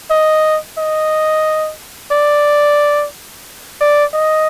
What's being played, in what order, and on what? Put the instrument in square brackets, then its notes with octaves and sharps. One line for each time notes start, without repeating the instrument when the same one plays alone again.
[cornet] D#5
D#5
D5
D5
D#5